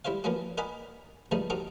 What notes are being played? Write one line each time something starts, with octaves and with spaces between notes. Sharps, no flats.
G3 E4 C5 C#5 F5
F3 A#3 B3 C#4 D4 F#4
A#4 D5 D#5 F#5 G#5 B5
G2 C#3 F3 G3 A3 D#4
C4 D4 D#4 F#4 G4 A#4